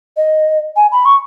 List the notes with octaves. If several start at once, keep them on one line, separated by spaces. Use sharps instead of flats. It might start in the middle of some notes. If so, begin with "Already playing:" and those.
D#5
G#5
B5
C#6